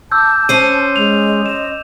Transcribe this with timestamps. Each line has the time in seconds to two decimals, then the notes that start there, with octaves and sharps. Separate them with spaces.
0.12 A5 D6 E6 G6
0.49 C#4 C5 D#7
0.96 G#3 F7
1.46 D#5 E7